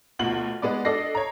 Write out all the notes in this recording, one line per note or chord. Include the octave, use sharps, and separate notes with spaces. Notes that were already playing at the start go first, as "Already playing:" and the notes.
D2 B2 F4 F#7
G#3 B3 D5
D4 A4 D5 D#5 A#6 C7
C#5 A#5